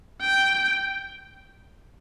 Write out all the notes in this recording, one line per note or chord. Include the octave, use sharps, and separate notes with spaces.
G5